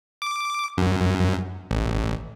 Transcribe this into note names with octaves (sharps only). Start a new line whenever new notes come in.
D6
F#2
A1